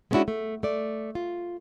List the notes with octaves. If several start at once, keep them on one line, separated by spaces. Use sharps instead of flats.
G#3 B3 C#4 D4 E4 F#4
A3
A3 D5
F4